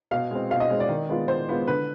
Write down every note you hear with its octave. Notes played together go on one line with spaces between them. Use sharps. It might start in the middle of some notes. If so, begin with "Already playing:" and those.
B2 F5
G#3 C4
B2 F5
D#5
G#3 C4
D5
D#3
G#3 B3 F4
D#3 C5
G#3 B3 F4
D3 B4